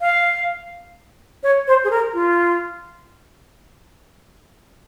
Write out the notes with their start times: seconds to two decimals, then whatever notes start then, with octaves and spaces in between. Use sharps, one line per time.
0.01 F5
1.43 C#5
1.67 C5
1.84 G#4
1.91 A#4
2.14 F4